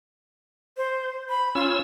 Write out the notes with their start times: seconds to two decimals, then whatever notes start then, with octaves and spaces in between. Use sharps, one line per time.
0.77 C5
1.29 B5
1.55 C#4 F4 E6